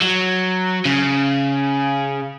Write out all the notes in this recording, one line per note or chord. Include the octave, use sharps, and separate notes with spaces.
F#3
C#3